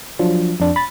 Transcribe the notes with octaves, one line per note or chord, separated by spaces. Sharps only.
F3 F#3 D4 F4
F2 D4
B5 A6